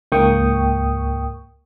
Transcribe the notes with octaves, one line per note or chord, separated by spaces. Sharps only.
C#2 G#2 A#3 G5 C#6 D#6